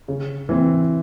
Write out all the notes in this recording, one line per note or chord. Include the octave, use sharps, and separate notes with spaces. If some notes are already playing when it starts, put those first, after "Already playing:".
C#3
E3 C4